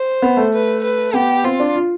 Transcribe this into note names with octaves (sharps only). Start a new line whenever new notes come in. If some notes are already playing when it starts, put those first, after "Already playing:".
Already playing: C5
B3
A3
B4
B4
B3 G4
C4 F4
D4
F4